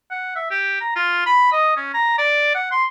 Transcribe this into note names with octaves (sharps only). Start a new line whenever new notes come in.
F#5
E5
G4
A#5
F4
B5
D#5
C#4
A#5
D5
F#5
C6